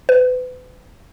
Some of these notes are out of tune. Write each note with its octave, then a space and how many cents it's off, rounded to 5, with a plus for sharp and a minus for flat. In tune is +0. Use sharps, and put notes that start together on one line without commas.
B4 +35